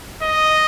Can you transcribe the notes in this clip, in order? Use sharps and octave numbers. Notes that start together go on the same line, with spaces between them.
D#5